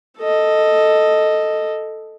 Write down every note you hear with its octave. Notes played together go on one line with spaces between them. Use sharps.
A4 D#5